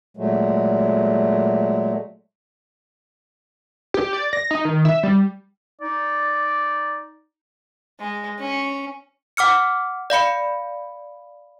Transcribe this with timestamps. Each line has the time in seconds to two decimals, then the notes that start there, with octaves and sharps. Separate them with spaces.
0.17 A#2 F#3 G#3 A3
3.94 G4
4.13 D5
4.33 A#6
4.51 D#4
4.65 D#3
4.85 E5
5.03 G3
5.81 D#4 D5
8.00 G#3
8.40 C#4
9.37 F#5 D6 F6 C#7
10.10 D5 F5 B5 C#7